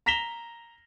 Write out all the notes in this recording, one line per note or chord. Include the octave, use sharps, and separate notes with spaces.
A#5 A#6 B6 E7 F7 G7